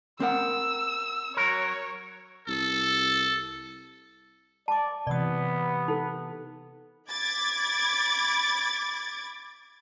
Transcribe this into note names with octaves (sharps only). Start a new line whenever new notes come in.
C4 A#4 F#5 E6
F#3 A#4 C#5
C2 A4
D5 A5 D6
C3 E3 B3 D5 D#6
D#4 A4
B5 D6 G#6 A6